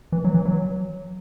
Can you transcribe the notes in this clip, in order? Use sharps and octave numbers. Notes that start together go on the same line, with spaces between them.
E3
F#3
E3
F#3